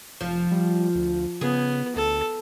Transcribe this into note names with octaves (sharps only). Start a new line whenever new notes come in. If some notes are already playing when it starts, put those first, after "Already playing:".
F1 F3
G3
D2
C#3 B3 G#4
D2 A4